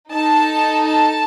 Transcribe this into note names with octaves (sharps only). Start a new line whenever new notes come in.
D#4 A4 A5
A5